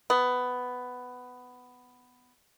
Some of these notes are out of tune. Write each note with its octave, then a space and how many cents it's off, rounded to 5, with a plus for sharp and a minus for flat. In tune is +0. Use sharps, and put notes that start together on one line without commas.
B3 +10